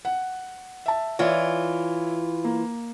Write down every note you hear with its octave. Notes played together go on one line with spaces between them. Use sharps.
F#5
E5 A5
E3 F4 C#5 D5 E5
A#3